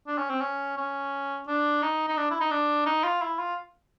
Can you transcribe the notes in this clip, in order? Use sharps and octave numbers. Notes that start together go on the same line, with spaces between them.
D4
C#4
C4
C#4
C#4
D4
D#4
D#4
D4
E4
D#4
D4
D#4
F4
E4
F4